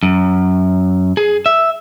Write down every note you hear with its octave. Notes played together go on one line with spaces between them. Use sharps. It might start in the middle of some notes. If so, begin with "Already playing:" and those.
F#2
G#4
E5